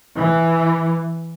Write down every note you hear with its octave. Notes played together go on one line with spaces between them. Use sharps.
E3